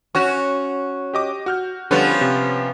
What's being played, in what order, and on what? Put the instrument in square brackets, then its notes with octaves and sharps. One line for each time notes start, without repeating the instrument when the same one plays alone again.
[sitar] C#4 F#4 [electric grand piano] C#6
[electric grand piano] G4 D#5 D6
F#4 F6 G6
[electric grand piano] D3 G3 [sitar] F3 B3 C#4
[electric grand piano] C3